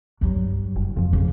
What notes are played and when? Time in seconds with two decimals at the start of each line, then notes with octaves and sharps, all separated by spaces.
0.21 G2 F#3
0.76 F#1
0.97 F2 F3
1.13 C#3